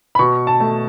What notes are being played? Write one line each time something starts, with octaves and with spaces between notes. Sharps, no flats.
B5
B2 C#6
A5
A3